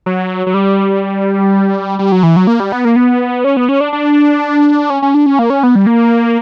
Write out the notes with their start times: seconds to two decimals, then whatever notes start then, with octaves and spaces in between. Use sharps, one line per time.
0.06 F#3
0.47 F#3
0.54 G3
1.99 G3
2.12 F#3
2.23 E3
2.36 F#3
2.47 A#3
2.60 G3
2.72 B3
2.85 A#3
2.96 B3
3.44 C#4
3.57 B3
3.69 C#4
3.81 D4
3.93 D4
4.90 C#4
5.02 C#4
5.14 D4
5.26 C#4
5.39 A#3
5.50 C#4
5.63 B3
5.75 G3
5.86 A#3